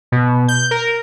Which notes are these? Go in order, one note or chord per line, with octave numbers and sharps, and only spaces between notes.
B2
G6
A#4